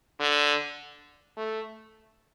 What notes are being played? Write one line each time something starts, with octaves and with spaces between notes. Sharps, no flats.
D3
A3